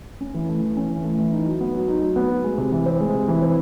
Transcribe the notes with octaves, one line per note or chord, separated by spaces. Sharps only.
C#4
E3
A3
E3
C#4
E3
A3
E3
D#4
F#3
B3
F#3
D#4
F#3
B3
F#3
G#3
C3
E3
C4
G#3
C3
E3
C4